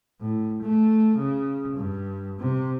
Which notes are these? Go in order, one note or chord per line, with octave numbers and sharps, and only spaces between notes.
A2
A3
C#3
G2
C3